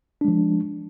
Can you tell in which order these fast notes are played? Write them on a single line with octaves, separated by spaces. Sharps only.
D4 G#3 F3